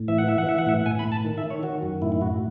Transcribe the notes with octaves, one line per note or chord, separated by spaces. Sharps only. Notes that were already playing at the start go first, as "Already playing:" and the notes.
Already playing: A2
E3 E5
F#5
E3 E5
F#5
E3 E5
F#5
A2 E5
A2 G#5
B5
A2
A5
D#3
E5
D#3
C#5
D#3 F#4
F#2
A2 E4
E4
A2 F#4